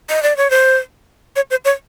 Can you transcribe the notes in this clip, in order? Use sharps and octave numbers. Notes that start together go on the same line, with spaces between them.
D#5
D5
C#5
C5
C#5
C5
C#5